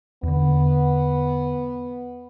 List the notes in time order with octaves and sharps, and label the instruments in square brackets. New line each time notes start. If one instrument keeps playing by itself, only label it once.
[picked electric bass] E2 D3 [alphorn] B3